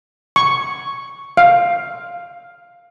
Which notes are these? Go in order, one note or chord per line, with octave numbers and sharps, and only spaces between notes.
C#6
F5